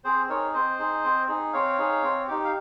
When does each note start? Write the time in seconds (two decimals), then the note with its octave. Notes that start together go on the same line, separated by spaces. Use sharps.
0.04 C4 G#4 C5
0.29 D#4 G#4 A#4 C#5
0.53 C4 C5 D#5
0.79 D#4 G#4
1.04 C4
1.28 D#4 G#4
1.53 C4 C#5 F5
1.78 D#4 G#4
2.02 C4
2.28 D#4 G4
2.44 F5